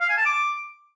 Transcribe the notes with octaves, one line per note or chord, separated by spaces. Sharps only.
F5
G#5
A5
D6